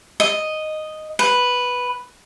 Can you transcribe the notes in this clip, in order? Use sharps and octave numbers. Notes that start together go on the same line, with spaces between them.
D#5
B4